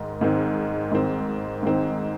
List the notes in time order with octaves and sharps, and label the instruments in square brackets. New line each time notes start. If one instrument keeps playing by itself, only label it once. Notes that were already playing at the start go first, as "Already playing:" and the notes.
Already playing: [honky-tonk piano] G#2 D#3
G#2 D#3 C4
G#2 D#3 C4
G#2 D#3 C4